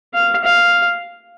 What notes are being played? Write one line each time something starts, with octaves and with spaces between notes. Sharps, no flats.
F5
F5